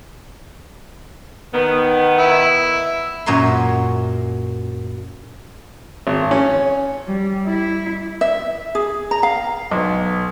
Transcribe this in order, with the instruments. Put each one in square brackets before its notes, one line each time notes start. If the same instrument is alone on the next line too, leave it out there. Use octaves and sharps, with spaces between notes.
[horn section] D#3 B3
[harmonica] E4
[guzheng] F#2 A#2 C#5 A#5 C6
[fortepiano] G#1
C#4
[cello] G3
E4
[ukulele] E5
G#4
A#5
F5
[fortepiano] B1